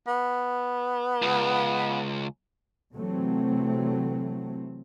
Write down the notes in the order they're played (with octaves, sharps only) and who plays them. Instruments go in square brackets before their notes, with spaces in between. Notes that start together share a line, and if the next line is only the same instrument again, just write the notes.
[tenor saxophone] B3
[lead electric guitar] C#2
[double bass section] C3 E3 F#3 A3 C4